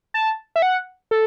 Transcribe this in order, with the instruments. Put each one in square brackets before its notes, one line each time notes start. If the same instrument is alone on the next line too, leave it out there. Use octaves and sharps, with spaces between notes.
[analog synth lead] A5
E5
F#5
A4